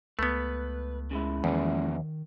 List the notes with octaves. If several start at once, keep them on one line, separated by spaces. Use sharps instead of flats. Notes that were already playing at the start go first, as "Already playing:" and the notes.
C#2 A3 B3 B4
C#3 G#3 E4
E2 D#3 F3 A#3 C#4